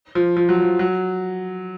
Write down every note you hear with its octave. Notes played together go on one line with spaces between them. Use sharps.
F3
F3
F#3
F3
F#3